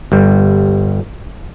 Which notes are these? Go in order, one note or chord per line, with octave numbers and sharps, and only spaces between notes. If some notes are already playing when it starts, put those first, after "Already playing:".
G1 G3